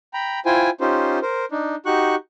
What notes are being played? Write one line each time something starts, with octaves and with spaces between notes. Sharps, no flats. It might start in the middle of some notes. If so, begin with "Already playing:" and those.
G5 A#5 B5
E4 F4 C5 G5 G#5
C#4 D#4 F4 G4 C5
A#4 C5
D4 D#4
D#4 F#4 G4 C#6 F#6